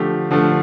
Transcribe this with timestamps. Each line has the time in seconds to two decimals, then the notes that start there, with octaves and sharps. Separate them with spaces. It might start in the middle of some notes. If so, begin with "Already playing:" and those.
Already playing: D3 F3 A3 G4
0.31 D3 F3 A3